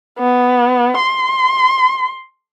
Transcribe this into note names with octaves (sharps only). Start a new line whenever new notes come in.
B3
C6